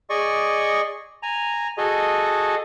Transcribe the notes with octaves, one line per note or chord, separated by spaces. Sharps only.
G#4 D5 D#5 C#6
G#5 A#5
F#4 G#4 A4 D#5